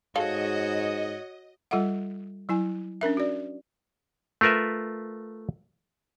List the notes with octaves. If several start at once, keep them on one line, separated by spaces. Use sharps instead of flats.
G#2 F#4 G#4 A4 C#5 D#5 F5
G3 F4 A4 E5 F#5
F#3 E4 G#5
C#4 D4 A#4 E5
F#4 D5
A3 F4 A#4 B4 E5